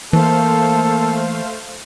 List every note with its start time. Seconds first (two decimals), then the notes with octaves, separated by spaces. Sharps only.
0.13 E3 A3 A#3 A4 C5 F5